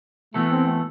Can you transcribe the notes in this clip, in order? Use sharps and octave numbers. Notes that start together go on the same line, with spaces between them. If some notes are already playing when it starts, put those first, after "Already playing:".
E3 A3 B3 F#4 A4
C4
A3